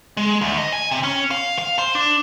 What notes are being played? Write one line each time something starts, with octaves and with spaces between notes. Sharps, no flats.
G#3
D2
D#5
G#5
C3
C#4
F5
F5
C5
D4